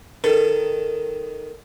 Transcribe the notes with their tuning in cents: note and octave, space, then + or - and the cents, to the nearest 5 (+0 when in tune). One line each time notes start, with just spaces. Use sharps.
D#3 +0 A4 +0